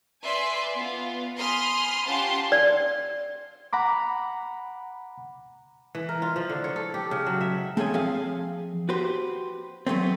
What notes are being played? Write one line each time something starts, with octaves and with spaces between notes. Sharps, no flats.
B4 D5 E5 G#5 C6
B3 F4
G#5 B5 C6 D#6 F6
C#4 F4 G4 F#5 A5 C6
D5
F#5 A#5 B5 D6
E3
A#4
F4
F3
D3
C#5
A4
G4
C#3
F#3
E5
A3 C4 G#4 A4 C#5 G#5
F3 C4 G#4 F5
F#4 G4 B4 C5
F#3 A3 B3 C4